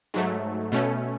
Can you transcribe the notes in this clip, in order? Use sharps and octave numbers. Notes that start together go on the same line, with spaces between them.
G#2 F#3 A3
B2 A3 C#4